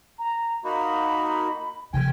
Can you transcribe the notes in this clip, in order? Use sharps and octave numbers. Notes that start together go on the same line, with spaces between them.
A#5
A#3 D#4 F#4 B5
C3 F3 G5 G#5